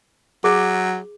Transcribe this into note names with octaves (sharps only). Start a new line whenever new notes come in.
F#3 G#4